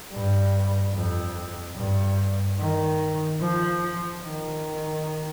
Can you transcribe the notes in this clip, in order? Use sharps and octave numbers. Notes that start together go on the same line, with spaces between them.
G2
F2
G2
D#3
F3
D#3